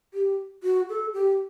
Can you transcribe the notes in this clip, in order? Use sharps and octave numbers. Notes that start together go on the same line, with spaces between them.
G4
F#4
A4
G4